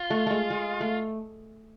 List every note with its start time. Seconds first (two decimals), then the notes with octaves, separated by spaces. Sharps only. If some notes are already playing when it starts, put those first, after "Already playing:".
Already playing: F4
0.10 A3
0.27 G#3 A3
0.50 G#3
0.81 A3